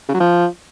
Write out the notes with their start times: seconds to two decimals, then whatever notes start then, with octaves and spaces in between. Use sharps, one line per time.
0.09 C#3
0.14 F#3
0.20 F3